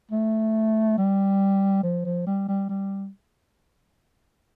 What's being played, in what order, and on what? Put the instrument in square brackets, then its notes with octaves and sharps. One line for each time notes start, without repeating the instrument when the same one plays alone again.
[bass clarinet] A3
G3
F3
F3
G3
G3
G3